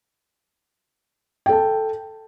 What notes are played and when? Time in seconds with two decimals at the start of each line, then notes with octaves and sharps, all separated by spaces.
1.46 G5
1.49 A4
1.52 A5